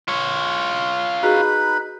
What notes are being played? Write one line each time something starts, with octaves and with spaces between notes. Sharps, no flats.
F4 C#5
D#4 F#4 G#4 B4 B5